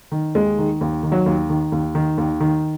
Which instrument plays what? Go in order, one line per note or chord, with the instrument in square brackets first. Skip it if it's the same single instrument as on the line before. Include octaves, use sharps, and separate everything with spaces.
[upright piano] D#3
D#2 G#3
D#3
D#2
D#3
F#3
D#2
D#3
D#2
D#3
D#2
D#3